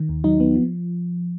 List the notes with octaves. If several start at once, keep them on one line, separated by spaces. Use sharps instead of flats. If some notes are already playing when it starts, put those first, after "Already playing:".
Already playing: D#3
D#2
F#3 D#4
D#2 B3
F3